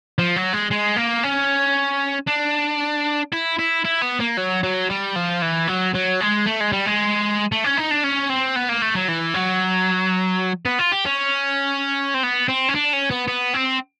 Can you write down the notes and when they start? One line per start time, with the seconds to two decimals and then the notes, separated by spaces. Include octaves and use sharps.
0.19 F3
0.36 F#3
0.53 G#3
0.71 G#3
0.96 A#3
1.23 C#4
2.27 D4
3.33 E4
3.59 E4
3.84 E4
4.02 B3
4.20 A#3
4.37 F#3
4.63 F#3
4.90 G3
5.16 F3
5.42 E3
5.67 F#3
5.94 F#3
6.20 G#3
6.46 A3
6.60 G#3
6.72 G3
6.86 G#3
7.52 A3
7.64 C#4
7.77 D#4
7.91 D4
8.04 C#4
8.30 C4
8.56 B3
8.69 A#3
8.82 A3
8.95 F#3
9.08 E3
9.34 F#3
10.65 B3
10.79 F4
10.92 G4
11.05 C#4
12.14 C4
12.23 B3
12.48 C4
12.69 C#4
12.75 D4
12.93 C#4
13.11 B3
13.28 B3
13.53 C4